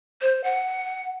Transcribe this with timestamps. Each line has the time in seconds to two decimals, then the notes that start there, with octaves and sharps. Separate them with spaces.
0.22 C5
0.44 F#5